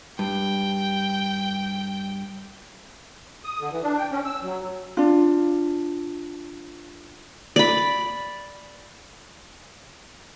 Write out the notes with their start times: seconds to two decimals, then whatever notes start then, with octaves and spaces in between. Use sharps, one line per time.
0.19 G2 G5
3.44 D#6
3.60 D3
3.72 E3
3.83 D4
3.98 G5
4.11 C#4
4.25 E6
4.42 F#3
4.97 D4 F4
7.56 D5 B5